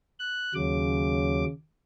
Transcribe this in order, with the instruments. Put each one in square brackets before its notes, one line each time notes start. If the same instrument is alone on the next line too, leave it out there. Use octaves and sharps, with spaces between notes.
[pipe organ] F#6
[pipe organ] D#2 F#3 D6 [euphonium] C#3